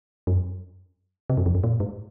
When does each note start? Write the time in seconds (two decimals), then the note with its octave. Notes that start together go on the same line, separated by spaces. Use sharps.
0.27 F#2
1.30 C3
1.37 F#2
1.46 F2
1.55 F#2
1.64 A#2
1.80 G#2